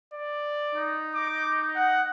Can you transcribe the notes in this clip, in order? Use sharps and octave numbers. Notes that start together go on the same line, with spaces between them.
D5
D#4
D6
F#5